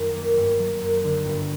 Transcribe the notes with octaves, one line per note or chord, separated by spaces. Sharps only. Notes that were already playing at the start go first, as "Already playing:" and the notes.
Already playing: F#2 D#3 G3
A#3
G1
F#3
F#2
D3
G1